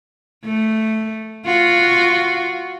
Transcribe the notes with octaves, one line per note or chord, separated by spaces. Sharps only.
A3
F4 F#4